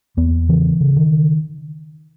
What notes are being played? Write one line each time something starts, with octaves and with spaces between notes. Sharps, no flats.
E2 B3
C#3 E3
C#3
D#3